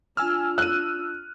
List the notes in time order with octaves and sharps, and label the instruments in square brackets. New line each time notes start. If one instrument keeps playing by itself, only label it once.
[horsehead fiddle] D4 F4 [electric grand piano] G#5 E6 F6
[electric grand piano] E6 D#7 [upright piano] F#6